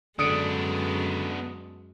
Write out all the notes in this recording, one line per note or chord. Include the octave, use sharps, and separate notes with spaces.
F#2 D3 G#3 B3 D4 D#6 C#7 D7